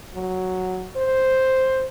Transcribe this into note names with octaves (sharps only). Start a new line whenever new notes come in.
F#3
C5